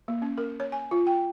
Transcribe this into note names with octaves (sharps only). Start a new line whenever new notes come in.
A#3
C#4
A#4
C#5
G#5
F4
G5